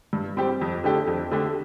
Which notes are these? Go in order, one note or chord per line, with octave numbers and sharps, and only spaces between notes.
G2
G3 C4 G4
F2
D3 A3 D4 G4
F2
D3 A3 D4 G4